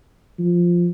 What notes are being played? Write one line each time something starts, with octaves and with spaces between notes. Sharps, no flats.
F3